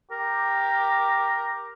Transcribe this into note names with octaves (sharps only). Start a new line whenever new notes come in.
G4 A#4